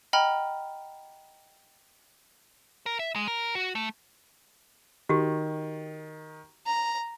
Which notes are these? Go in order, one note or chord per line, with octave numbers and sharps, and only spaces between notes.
D#5 F#5 G5 A#5 B5 F6
A#4
E5
G#3
A#4
F#4
A3
D#3 F#4 G4
A#5